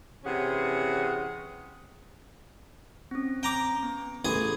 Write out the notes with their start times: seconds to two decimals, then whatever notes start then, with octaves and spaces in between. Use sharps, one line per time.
0.24 C3 E3 C#4 G#4 F#5
3.11 C4 C#4
3.43 G5 A#5 D6
3.83 B3
4.25 A1 G#4 G#5 D#6